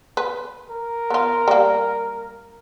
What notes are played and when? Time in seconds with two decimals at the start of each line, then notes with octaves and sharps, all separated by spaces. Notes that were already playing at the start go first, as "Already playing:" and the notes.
0.17 B4
0.70 A#4
1.10 B3 F4
1.48 G3 A#3